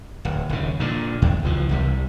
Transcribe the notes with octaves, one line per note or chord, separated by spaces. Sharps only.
D1
D#1 C#3
A#2 D3
E2
C#2 E3 F3
C2 C3 G3